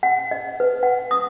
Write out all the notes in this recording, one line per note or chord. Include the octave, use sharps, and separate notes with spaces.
F#5
D#5
B4
F#5
D#6